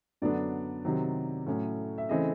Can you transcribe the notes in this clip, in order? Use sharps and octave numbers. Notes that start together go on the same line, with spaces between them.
F#2 D3 F#3 B3 D4 D5
C3 D#3 F#3
A2 F#3 A3 C#4
E5
C#3 E3 A3 C4 D#5